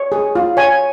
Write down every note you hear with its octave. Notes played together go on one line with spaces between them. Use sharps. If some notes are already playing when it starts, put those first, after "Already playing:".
Already playing: C#5
G#4
F4
C#5 G#5